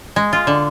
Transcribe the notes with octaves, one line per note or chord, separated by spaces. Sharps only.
G#3
F4
D3